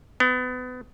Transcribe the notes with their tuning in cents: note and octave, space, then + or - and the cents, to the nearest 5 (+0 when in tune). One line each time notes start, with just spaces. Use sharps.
B3 +30